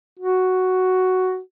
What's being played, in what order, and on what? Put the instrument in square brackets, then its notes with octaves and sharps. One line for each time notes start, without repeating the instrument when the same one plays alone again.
[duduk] F#4